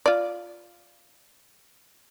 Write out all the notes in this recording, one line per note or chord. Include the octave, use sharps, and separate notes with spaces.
F4 D5